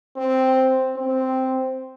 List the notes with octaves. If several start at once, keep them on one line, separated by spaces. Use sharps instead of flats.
C4
C4